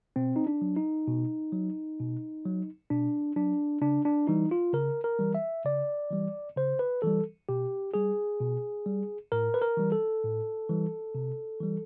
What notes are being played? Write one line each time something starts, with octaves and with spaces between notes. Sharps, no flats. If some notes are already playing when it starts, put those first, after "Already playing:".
B2 C4
D#4
D4
F#3
D#4
B2
F#3
B2
F#3
B2 D4
F#3 D4
C#3 D4
D4
E3 G3 D#4
F4
C#3 A#4
A#4
E3 G3
E5
C#3 D5
E3 G3
C#3 C5
B4
E3 G3 A4
B2 G4
G3 G#4
B2
G3
A2 A#4
B4
A#4
E3 G3
A4
A2
E3 G3
C3
E3 G3